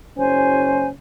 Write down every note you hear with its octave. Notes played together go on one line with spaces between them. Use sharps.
F#1 C#4 C5 G#5